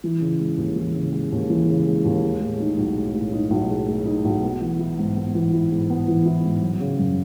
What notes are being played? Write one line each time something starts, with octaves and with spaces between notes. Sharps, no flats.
E3
C#3
G#3
D#2
E3
C#3
G#3
D#2
E3
C#3
G#3
D#2
G#3
A2
D#4
B1
G#3
A2
D#4
B1
G#3
A2
D#4
B1
B3
E3
E4
G#2
B3
E3
E4
G#2
B3
E3
E4
G#2
F#3
C#3
F#2